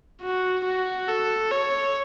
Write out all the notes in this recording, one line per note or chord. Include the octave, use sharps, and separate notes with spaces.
F#4
F#4
A4
C#5